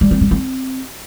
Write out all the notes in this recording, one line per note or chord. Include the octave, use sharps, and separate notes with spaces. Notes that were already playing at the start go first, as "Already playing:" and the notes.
G3
C4
G3
C4